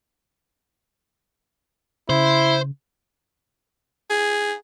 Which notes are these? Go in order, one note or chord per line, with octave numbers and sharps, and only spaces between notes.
C#3 E4 C5
G#4